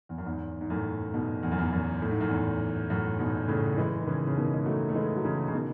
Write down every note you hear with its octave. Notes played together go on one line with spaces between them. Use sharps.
E2
F#2
E2 G#2
G#2
F#2 A2
G#2 B2
E2
F#2
E2
F#2
A2
G#2
F#2
E2 G#2
F#2 A2
G#2 B2
A2 C#3
E3 G#3
D#3
C#3 E3
C#3
B2 D#3
G#3
F#3 A3
A3
E3 G#3
F#3
C#3 E3
C#3
B2 D#3